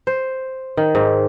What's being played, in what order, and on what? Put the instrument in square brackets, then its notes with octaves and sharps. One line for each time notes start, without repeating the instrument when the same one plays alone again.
[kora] C5
D#3
G#2